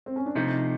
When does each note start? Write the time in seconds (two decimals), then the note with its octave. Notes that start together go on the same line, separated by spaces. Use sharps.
0.06 C4
0.16 C#4
0.26 D4
0.36 C3 F3 A3 D#4